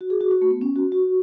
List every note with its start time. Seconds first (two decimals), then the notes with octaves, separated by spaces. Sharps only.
0.01 F#4
0.10 G#4
0.21 F#4
0.31 F#4
0.42 A3
0.51 B3
0.61 C#4
0.76 F#4
0.92 F#4